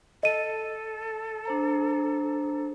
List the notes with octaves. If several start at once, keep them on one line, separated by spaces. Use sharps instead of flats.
A4 D#5 D#7
D4 C5 A#5